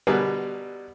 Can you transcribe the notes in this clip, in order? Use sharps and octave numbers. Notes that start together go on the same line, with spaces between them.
B2 D3 G3 G#4 A#4 B4